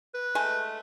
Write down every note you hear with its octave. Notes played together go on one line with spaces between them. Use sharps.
B4
G#3 A3 G#5